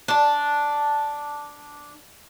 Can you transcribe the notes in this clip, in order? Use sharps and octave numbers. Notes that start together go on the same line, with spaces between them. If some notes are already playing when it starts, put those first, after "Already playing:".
D4 A5